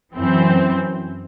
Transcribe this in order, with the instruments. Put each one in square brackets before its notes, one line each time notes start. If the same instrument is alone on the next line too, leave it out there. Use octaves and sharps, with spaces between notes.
[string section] F#2 E3 C4